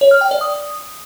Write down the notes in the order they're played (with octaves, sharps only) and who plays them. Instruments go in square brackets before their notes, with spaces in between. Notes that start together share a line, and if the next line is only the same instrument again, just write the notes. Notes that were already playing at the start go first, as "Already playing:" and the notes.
[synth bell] C#5
F6
G5
D5
D#6